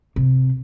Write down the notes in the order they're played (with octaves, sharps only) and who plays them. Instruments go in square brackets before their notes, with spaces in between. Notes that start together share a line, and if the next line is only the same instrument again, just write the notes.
[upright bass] C3